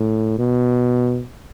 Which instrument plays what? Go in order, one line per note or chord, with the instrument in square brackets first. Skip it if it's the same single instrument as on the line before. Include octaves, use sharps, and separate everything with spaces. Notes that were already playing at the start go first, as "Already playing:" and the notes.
Already playing: [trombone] A2
B2